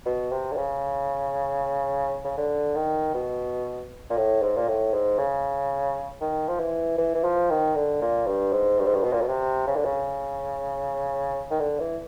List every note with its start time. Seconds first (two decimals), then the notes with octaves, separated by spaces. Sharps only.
0.06 B2
0.32 C3
0.53 D3
0.57 C#3
2.25 C#3
2.37 D3
2.75 D#3
3.14 B2
4.10 A#2
4.17 A2
4.42 G#2
4.57 A#2
4.68 A2
4.94 G#2
5.19 C#3
6.21 D#3
6.48 F3
6.60 E3
6.98 E3
7.15 E3
7.24 F3
7.50 D#3
7.75 D3
8.02 A#2
8.27 G2
8.53 G#2
8.79 G2
8.86 G#2
8.94 G2
9.03 B2
9.13 A#2
9.22 B2
9.29 C3
9.67 C#3
9.76 D3
9.85 C#3
11.51 D#3
11.60 D3
11.80 E3